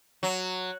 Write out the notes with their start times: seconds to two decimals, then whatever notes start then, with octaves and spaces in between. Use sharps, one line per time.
0.23 F#3